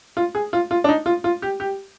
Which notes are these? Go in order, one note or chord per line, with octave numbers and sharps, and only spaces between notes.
F4
G#4
F4
F4
D4
D#4
F4
F4
G4
G4